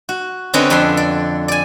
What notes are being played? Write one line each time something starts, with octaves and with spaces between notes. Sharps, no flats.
F#4
D3 C4 C#4 B4 C#5 D#5
F2 D4 F#5 B5 C6
D5
D5 G#5